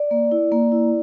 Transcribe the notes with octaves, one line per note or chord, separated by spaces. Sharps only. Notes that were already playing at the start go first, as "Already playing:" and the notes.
Already playing: D5
A#3
E4
A#3
E4